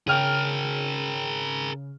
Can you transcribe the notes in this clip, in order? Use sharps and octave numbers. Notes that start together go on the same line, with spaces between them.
C#3 G#4 A#4 G5 F6